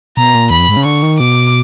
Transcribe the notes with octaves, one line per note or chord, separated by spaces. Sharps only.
B2 A#5
A#2
E2 B5
F2
G#2
C#3
D3 C#6
D#3
B2 D6